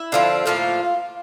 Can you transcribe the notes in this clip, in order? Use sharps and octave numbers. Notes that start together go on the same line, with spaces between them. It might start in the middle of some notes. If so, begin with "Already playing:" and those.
Already playing: E4
D3 F3 C4
A2 F3 A#3 F4